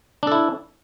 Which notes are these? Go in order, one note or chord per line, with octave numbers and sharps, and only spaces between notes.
D4 E4 A4